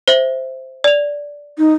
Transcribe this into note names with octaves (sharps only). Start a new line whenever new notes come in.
C5 E5 F#7
D5 F7
D#4